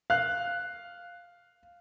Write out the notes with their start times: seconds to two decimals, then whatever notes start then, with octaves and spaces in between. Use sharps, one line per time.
0.10 F5 F#6